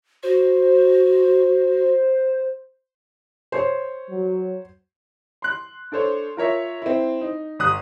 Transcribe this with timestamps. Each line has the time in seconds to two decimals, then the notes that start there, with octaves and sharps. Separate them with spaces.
0.23 F#4 C5
3.52 C5 C#5
4.08 F#3
5.42 C6 F#6
5.92 D4 A4 C5 C#5
6.37 F4 A#4 C#5 E5
6.82 C4 E4
7.21 D#4
7.59 G1 D#6 F#6